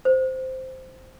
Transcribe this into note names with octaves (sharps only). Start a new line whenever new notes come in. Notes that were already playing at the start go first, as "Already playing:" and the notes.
C5